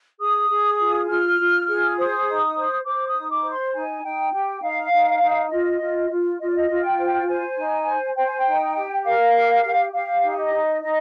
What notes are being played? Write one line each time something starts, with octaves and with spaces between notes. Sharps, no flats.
G#4 D#6
G#4
F4
F4 F6
F4
G#4
C5 D#6
D#4
C5
C5 D6
D#6
D#4
D6
C5
C6
D#4 G#5
D#4 G5
G4 G5
D#4 F5
D#4
D#4
F4 D#5
F4
F4
F4 D#5
D5
D#5
F4
G5
C5
C5 G#5
D#4
C5
C5 G5
G#5
G5
D#4
G4
A#4 F5
G4
G4
G4 F5
D#4
D#5
D#4
D#4 D#5